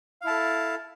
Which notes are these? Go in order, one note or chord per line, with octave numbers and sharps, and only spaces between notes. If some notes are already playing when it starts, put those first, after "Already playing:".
E4 A4 F5 A5